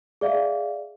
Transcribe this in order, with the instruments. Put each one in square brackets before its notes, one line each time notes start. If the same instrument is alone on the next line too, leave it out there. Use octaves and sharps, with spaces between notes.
[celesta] G#4 D5 E5 F5